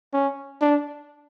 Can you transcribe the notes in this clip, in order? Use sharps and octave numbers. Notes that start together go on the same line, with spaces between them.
C#4
D4